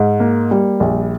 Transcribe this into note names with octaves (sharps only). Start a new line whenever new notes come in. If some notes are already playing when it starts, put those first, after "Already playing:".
Already playing: G#2
A#3
G3
A#1